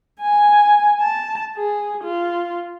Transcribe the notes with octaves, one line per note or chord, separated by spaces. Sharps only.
G#5
A5
G#4
F4